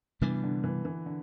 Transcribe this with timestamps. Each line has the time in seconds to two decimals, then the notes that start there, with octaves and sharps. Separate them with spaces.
0.21 C3 E3 G3 B3 D4
0.43 D3
0.64 E3
0.85 E3
1.06 D3